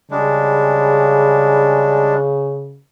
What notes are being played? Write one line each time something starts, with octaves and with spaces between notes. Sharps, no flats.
C#3 G3 G#3 D4